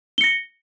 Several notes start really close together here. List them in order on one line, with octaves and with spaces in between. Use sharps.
G7 C#7 A#6